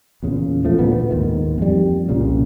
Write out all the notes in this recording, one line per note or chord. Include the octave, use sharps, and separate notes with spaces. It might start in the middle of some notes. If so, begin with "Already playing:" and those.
E2 A#2 C#3
E1 F3 A3
D2 A#2 B3
D#2 G#2 D#3
F2 G3
C2 A#2 C#3